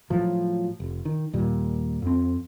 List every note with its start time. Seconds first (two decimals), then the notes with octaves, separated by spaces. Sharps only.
0.10 A2 F3 F#3
0.80 F1
1.05 D#3
1.33 D#2 A#2 G3
2.02 F2 C4